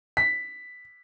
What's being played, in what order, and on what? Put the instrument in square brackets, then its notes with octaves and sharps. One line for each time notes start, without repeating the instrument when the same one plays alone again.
[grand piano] B6